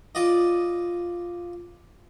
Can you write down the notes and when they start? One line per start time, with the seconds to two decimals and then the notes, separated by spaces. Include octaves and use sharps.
0.15 F4 D5 D#5